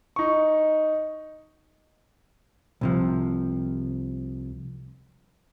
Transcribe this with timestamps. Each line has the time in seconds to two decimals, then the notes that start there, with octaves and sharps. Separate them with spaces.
0.16 D#4 C#6
2.81 C2 C3 F3